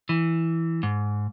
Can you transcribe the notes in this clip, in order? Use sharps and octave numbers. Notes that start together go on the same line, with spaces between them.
E3
G#2